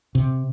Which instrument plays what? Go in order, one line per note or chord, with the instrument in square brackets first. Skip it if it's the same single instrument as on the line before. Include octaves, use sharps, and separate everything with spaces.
[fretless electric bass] C3